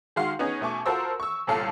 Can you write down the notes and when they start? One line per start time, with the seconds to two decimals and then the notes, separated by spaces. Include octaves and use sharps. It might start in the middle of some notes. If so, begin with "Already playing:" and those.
0.16 D#3 G#3 F#4 F5 C6
0.39 B3 C#4 D#4 G#4
0.61 B2 A3 G#5 C#6 D6
0.86 F4 F#4 A4 A#4 C5 E6
1.20 C#6 E6
1.47 G1 C2 A#2 A4 F5 E6